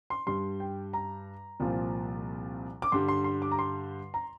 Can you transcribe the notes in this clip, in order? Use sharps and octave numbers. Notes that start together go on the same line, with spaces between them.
C6
G2 G3 C6
G5
A#5
C2 A#2 F3
D6
G2 D3 G3 C6
C6
C6
D6
A#5
C6
A#5